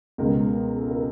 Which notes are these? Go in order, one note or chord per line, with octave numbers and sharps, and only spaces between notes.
C#2 B2 G#3 B3 A#4
A4
A#4